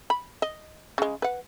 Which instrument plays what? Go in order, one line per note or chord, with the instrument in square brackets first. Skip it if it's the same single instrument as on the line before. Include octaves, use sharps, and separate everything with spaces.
[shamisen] B5
D#5
C#3 G#3
B4 F#5